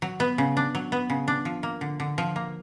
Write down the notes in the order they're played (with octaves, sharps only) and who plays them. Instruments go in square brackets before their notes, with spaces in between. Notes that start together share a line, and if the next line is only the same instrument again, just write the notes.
[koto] F#3
B3
C#3
D4
F#3
B3
C#3
D4
F3
A#3
D3
D3
F3
A#3